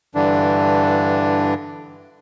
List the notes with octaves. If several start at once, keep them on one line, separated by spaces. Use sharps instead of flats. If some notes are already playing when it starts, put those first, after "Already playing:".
G2 D3 E3 D4